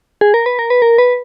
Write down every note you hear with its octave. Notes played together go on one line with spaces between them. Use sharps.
G#4
A#4
B4
A#4
B4
A#4
B4